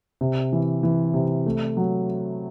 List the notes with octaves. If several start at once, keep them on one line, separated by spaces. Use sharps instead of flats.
C3
E3
E3
C3
A3
F#3